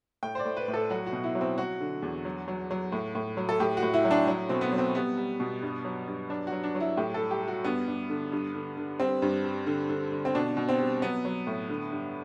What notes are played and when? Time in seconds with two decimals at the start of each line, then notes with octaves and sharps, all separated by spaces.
0.23 A2 G5
0.35 C5
0.39 D5
0.45 A2
0.57 B4
0.68 A2
0.74 A4
0.90 F#3 F#4
1.07 F#4
1.13 B2
1.24 E4
1.35 F#3
1.41 C4
1.58 F#3 F#4
1.80 D3
2.03 E2
2.25 F#3
2.48 F#3
2.71 F#3
2.92 A2
3.15 A2
3.37 F#3
3.49 A4
3.60 A2 G4
3.77 F#4
3.83 A2
3.94 E4
4.05 F#3
4.11 D4
4.27 F#3
4.49 B2 C4
4.61 B3
4.73 F#3
4.78 C4
4.95 G3 B3
5.17 G3
5.40 B2
5.62 G2
5.85 F#3
6.07 G2
6.30 F#3 D4
6.47 F#4
6.52 F#3
6.64 D4
6.75 F#3
6.80 E4
6.97 A2 G4
7.14 A4
7.20 G3
7.31 G4
7.42 G3
7.48 F#4
7.64 G2 B3
7.87 G2
8.10 D3
8.32 G2
8.55 D3
8.77 D3
9.00 G3 C4
9.22 G2
9.45 G3
9.67 D3
9.89 D3
10.12 D3
10.25 C4
10.35 B2 D4
10.57 B2
10.69 C4
10.79 G3
11.02 F#3 B3
11.25 F#3
11.47 A2
11.70 D3
11.92 G2